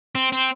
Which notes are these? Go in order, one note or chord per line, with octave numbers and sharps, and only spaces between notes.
C4
C4